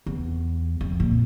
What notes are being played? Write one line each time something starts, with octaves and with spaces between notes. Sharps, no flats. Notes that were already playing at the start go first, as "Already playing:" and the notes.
E2
F2
A#2